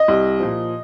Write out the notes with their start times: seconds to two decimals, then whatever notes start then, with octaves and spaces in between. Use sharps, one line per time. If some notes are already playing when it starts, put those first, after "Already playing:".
Already playing: D#5
0.08 C2
0.40 A#2 F3